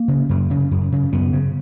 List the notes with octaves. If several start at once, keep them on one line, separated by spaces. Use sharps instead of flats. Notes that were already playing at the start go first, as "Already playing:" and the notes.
Already playing: A#3
C#3
F#2
C#3
F#2
C#3
F#2 B3
C#3